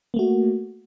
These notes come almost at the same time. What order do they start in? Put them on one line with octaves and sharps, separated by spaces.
A#3 A3 F#4